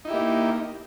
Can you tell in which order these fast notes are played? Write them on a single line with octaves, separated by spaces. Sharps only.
D#4 E4 G4 A#3